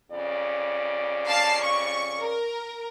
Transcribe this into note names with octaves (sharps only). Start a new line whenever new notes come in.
F2 C#3 D5
F5 A5 C7
C#6
A#4